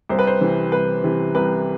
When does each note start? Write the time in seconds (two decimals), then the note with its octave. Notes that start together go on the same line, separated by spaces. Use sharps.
0.09 C2 C5
0.19 B4
0.27 C5
0.41 C3 E3
0.72 C2 B4
1.04 C3 E3
1.35 C2 B4